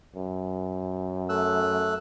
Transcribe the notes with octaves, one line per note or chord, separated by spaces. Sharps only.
F#2
A3 E6 F#6